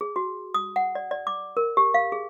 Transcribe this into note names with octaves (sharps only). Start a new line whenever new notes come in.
G#4
F#4
D#6
F#5
D5
D5
D6
A#4
G4
F5
G#4